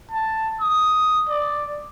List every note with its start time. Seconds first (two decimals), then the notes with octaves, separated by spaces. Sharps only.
0.11 A5
0.61 D#6
1.29 D5